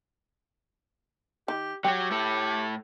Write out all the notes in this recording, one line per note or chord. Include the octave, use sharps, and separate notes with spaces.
D#3 G4
F#3 F#4 G4 G5
A2 E4 A4